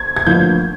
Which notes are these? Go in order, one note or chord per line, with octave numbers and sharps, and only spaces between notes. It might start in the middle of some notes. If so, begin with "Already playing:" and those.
Already playing: G#6
G#6
A1 G2 D3 F3 A#3 G6